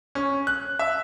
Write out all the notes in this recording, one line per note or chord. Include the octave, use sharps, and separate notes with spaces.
C#4
F#6
E5